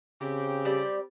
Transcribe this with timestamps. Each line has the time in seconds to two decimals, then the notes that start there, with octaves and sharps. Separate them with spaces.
0.21 C#3 C4 G4
0.65 G3 D5